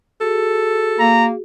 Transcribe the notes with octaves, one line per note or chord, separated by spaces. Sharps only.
F#4 G#4 A4
A#3 A#5